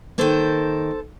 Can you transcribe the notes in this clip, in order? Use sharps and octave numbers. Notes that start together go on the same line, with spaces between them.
D#3 A#3 A4 C5